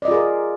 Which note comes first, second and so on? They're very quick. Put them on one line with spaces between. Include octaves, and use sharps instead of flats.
D5 D#5 F4 G#4 A#4